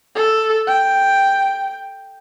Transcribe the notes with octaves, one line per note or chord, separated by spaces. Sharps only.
A4
G5